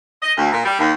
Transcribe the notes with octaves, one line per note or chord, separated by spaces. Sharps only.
D#5
D2
A#2
G3
D#2